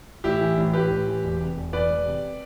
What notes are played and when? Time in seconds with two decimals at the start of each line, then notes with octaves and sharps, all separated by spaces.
0.24 A1 E4 G4
0.41 E3
0.57 A1
0.73 A2 G4 B4
0.91 A1
1.07 E3
1.23 E1
1.40 C3
1.57 E1
1.73 E2 B4 D5
1.90 E1
2.06 C3